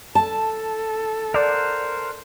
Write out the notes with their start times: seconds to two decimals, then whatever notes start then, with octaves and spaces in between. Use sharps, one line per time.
0.15 A4 A5
1.34 A#4 C5 D5 F#5